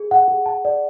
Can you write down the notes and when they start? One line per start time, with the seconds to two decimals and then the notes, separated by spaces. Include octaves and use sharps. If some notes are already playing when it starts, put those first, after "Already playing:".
Already playing: G#4
0.11 F#5
0.28 G#4
0.46 A5
0.65 D5